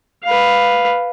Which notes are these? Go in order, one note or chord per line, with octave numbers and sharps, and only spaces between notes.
B4 F5